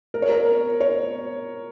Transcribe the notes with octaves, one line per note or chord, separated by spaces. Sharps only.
A#4
C#5
A#4
C#5